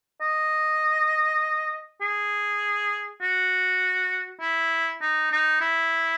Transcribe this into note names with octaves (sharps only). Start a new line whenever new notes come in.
D#5
G#4
F#4
E4
D#4
D#4
E4